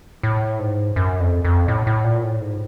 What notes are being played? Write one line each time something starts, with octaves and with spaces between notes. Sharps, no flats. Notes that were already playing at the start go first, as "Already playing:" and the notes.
A2
G#2
F#2
F2
F2
A2
A2
A#2
A2
G#2